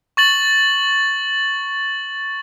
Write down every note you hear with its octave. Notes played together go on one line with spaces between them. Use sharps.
C#6 A6 F#7